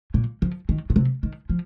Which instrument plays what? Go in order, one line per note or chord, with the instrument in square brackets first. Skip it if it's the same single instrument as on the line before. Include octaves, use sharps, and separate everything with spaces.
[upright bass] A#2
F3
D#3
A#2
C3
D#3
F3